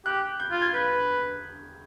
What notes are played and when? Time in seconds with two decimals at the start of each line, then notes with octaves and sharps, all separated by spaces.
0.05 G4 F#6
0.40 G6
0.51 F4
0.62 G#6
0.74 B4 G6